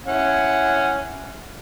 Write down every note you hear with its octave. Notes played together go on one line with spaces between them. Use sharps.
C#4 E4 F#5